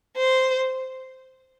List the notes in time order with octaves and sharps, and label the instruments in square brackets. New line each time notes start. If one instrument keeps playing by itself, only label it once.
[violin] C5